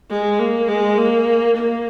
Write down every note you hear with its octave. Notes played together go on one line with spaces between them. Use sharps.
G#3
A#3
G#3
A#3
A#3